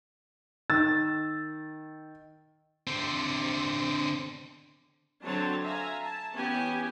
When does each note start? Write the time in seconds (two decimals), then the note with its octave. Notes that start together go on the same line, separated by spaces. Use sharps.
0.70 D#3 E6 A6
2.87 D3 C4
5.24 D3 F#3 C4 C#5 A5
5.61 E5 F5 G#5 A#5
6.03 A5
6.33 E3 B3 C#4 G4 G#5